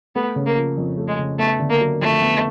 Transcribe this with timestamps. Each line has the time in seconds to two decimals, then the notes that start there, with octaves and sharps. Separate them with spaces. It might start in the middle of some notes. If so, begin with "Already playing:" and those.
0.15 A3 B3
0.36 C#3
0.46 A#3
0.57 F3
0.77 F2
0.98 A3
1.08 G#3
1.19 C#3
1.39 A3 B3
1.60 D3
1.70 A#3
1.81 F#3
2.01 F2 A3
2.22 B3